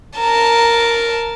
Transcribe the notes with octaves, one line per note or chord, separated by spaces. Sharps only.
A#4 A5